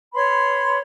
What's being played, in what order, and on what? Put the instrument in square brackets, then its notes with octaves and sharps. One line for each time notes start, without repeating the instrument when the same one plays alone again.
[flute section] B4 C#5 B5 C6